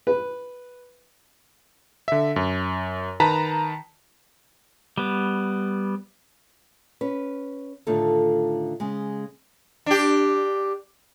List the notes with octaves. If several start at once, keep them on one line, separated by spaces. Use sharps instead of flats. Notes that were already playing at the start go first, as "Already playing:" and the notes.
B4
D3 E5
F#2
D#3 B4 A5 A#5 B6
G3 B3
C#4 B4
A2 D3 D#3 A3 F4 A4
C#3 G#3
D4 G4